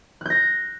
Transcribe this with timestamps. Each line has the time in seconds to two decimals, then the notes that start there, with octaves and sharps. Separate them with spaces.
0.21 F#6
0.26 G6
0.30 A#6